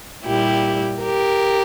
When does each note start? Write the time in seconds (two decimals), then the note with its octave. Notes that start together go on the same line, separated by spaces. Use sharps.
0.25 A#2 G3 E4 G4
1.02 G4 A#4